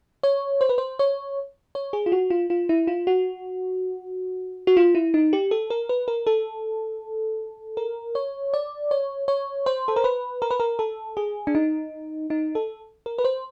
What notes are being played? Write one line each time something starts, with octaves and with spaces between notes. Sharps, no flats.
C#5
C5
B4
C5
C#5
C#5
G#4
F4
F#4
F4
F4
E4
F4
F#4
F#4
F4
E4
D#4
G4
A4
A#4
B4
A#4
A4
A#4
C#5
D5
C#5
C#5
C5
A4
A#4
B4
A#4
B4
A#4
A4
G#4
D4
D#4
D#4
A4
A#4
B4
C5